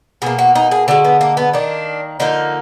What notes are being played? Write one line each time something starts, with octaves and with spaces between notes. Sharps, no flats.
B2 A#3 G#4
F#4
D#4
G#4
D3 G#3 F#4
B3
A#3
B3
D#3 A#3 D4
D3 F3 A#3 D#4